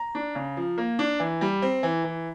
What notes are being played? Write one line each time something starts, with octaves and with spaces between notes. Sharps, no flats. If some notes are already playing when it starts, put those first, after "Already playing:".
Already playing: A#5
D4
C#3
F3
A#3
D4
E3
G3
C4
E3
E3